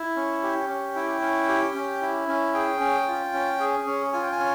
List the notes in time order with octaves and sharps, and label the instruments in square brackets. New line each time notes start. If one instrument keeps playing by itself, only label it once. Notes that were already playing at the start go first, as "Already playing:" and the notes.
Already playing: [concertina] E4
C#4
G4
C#4
E4 G5
C#4
G4
C#4
E4
C#4
G#4 G5
C#4
F4
C#4
G#4
C#4
F4 G#5
G5
G#5
C#4